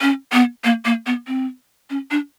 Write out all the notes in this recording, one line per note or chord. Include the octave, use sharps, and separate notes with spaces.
C#4
B3
A#3
A#3
B3
C4
C#4
D4